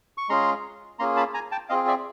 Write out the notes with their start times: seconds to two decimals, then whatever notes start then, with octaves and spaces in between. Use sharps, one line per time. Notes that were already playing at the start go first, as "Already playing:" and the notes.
0.18 C#6
0.29 G#3 C#4 F4 G#4 A#5 C6
0.99 A#3 C#4 F4 G#4 A#5 C6
1.17 A5 B5
1.34 G#5 A#5
1.52 G5 A5
1.69 C4 F4 G#4 D#5 F5
1.87 D5 E5